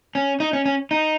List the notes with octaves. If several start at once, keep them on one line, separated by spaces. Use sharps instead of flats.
C#4
D#4
C#4
C#4
D#4